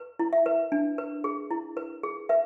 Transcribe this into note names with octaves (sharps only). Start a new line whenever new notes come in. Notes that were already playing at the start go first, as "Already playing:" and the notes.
Already playing: B4
E4
E5
B4
D4
B4
G#4
E4
B4
G#4
B4 E5